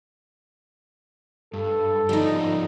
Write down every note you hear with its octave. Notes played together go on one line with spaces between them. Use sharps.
G2 A4
G#2 F3 G3 D#4 G4